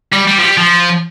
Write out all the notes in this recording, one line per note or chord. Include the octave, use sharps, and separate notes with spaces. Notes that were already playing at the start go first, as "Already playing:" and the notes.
G3
G3
F3
G3
F3